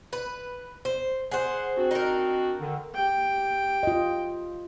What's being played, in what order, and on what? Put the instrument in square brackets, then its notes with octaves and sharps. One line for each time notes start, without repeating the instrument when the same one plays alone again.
[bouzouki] B4
C5
[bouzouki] G#4 C5 [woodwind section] F#5
[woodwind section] C4 D4 F#4
[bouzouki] D#4 A#4
[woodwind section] D3 D#3
[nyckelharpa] G4 G5
[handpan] F4 D#5